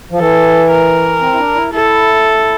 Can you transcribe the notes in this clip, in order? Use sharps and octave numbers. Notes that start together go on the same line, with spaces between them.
F3
E3 A4
A#4
C4
E4
D4
E4
E4 A4